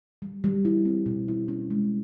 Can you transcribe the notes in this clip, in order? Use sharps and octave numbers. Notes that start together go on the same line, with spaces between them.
G3
G3
E4
C4
B2
E4
C#4
G#3